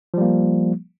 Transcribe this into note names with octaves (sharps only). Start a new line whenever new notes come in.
F3 G3 A#3